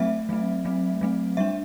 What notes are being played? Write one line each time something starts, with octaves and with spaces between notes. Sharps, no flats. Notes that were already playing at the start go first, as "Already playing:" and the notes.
Already playing: F#3 A3 C4 E5
F#3 A3 C4
F#3 A3 C4
F#3 A3 C4
G3 D4 E5